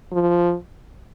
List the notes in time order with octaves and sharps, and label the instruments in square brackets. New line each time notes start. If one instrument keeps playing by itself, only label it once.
[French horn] F3